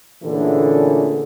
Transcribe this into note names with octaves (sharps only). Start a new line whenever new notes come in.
A#2 D3 E3 A3 C#4 G#4